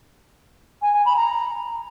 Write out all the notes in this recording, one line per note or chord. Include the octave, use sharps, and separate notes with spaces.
G#5
G#5
B5
A#5